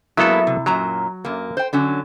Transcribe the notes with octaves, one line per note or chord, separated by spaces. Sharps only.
F#3 G#3 A#3 B3 E4 A4
C3
F#2 A#2 F#3 A#5
F#2 A#3
C5 G5
D3 F#3 C#4